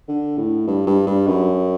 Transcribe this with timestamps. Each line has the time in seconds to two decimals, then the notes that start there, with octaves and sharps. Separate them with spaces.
0.08 D3
0.38 A2
0.67 G2
0.87 G2
1.07 G2
1.27 F#2